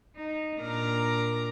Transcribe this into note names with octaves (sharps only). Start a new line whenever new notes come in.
D#4
A#2 D4 A#4 A#5 D6